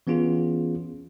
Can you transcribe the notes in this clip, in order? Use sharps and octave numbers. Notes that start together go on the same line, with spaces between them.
E3 B3 C#4 F4 G#4